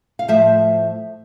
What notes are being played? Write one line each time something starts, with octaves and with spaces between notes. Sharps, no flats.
F5
A2 F3 A3 C5 E5